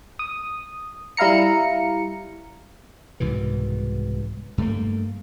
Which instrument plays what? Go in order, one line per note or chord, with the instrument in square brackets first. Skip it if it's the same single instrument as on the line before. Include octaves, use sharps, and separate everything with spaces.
[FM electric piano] D#6
G3 E4 F5 A#5 C#7
[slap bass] C2 G#2 B2 E3
G2 A3 A#3